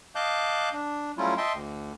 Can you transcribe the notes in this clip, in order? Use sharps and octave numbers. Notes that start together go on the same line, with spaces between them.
D#5 F5 A5 D6 F#6 G6
D4
F#3 G3 A3 C#4 E4 F4
D#5 E5 G5 A5 C6
D2